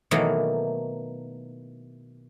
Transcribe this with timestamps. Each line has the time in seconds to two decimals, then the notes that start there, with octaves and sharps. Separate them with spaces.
0.11 B2 D#3 E3 F#3 A3 A#3